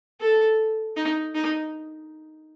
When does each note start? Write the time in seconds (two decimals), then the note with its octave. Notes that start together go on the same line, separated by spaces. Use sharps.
0.21 A4
0.96 D#4
1.35 D#4